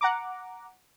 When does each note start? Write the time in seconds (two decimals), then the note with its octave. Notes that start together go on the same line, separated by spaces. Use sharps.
0.01 F#5 A#5 D6